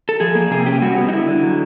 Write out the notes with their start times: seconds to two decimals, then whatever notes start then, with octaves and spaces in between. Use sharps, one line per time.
0.09 A4
0.20 F3 G#4
0.35 A#3
0.51 C3 G#4
0.66 C#4 G4
0.82 G3 F#4
0.98 B3
1.09 D#4
1.12 D3 E4
1.28 D3
1.43 F#3